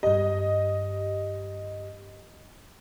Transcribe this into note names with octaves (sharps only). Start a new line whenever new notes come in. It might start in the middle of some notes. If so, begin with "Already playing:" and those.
G2 G4 D#5